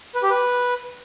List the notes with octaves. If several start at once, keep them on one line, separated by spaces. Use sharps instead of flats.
B4
G4
B4